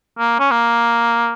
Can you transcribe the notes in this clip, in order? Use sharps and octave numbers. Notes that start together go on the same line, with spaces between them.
A#3
C#4
A#3